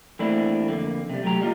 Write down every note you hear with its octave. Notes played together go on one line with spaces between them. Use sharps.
E3 A3 A#3 C4 D4 E4
F2 D3 A#3
C3 G3
F#3 A3 G4 A#5
G3 A#3 F4 D#5